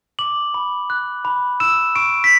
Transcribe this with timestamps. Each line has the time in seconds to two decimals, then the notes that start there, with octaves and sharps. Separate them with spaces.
0.19 D6 F#7
0.54 B5
0.90 F#6
1.25 B5
1.60 E6 E7
1.96 C#6 D7
2.24 B6